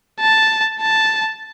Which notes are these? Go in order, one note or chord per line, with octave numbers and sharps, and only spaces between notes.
A5
A5